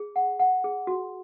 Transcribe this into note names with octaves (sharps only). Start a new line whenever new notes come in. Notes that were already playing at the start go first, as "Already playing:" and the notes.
Already playing: G#4
F#5
F#5
G#4
F#4